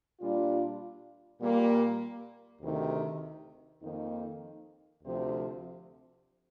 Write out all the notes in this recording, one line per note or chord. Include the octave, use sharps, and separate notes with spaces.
A#2 G3 D4 F4
A#2 G3 A#3
D2 C3 D#3
F2 D#3 A#3 D#4
D2 C3 F3 C4